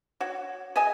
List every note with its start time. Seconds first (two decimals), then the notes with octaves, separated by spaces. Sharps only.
0.21 F#4 C#5
0.76 G#4 D#5 E5 G#5